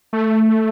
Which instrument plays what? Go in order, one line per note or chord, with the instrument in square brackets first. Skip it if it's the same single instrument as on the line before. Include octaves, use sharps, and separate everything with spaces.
[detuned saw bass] A3